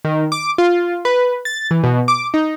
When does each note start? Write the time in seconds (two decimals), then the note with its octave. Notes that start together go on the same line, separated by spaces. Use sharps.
0.05 D#3
0.32 D6
0.58 F4
1.05 B4
1.45 A6
1.71 E3
1.83 B2
2.08 D6
2.34 D#4